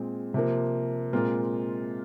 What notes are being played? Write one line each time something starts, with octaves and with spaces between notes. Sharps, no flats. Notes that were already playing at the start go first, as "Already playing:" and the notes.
Already playing: A#2 G#3 C4 G#4
C3 F3 A#3
A#2 G#3 C4 F4 A#4